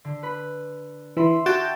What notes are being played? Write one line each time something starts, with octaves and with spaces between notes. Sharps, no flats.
D3
B4 B5
E3 E5 B5 C6
F#4 G5 A5